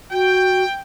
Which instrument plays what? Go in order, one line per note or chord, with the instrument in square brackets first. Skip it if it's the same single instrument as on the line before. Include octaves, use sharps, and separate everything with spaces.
[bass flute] F#4 [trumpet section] G5